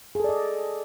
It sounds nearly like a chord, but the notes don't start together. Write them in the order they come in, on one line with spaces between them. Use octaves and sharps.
G#4 A4 D5 D#5